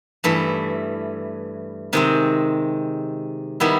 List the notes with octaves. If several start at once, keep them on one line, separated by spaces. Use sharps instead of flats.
G2 E3 A3
C3 D#3 G#3 C4
D#3 G3 B3 E4